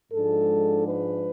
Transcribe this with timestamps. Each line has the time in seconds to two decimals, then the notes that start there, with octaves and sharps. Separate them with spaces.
0.12 G#2 F3 G#3 D4 A4
0.88 B4